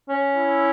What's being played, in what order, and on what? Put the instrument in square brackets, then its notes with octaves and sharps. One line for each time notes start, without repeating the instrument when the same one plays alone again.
[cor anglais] C#4
[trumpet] E4